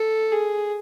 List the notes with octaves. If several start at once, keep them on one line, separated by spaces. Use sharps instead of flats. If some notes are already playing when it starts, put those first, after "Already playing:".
Already playing: A4
G#4